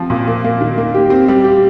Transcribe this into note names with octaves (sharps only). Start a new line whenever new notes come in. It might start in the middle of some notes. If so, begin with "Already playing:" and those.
Already playing: F3 C4
A#2
A#3
A#3
D#3
A#3
G4
C4
G3
G4